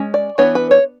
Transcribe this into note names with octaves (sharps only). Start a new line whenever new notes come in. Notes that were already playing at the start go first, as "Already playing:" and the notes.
Already playing: G#3 C#4
D5
E3 B3 D4 C#5
B4
C#5